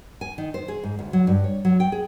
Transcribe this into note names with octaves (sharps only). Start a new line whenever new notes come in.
G#5
D#3
C5
G#4
G#2
D2
F#3
G2
C#5
F#3
G5
G#4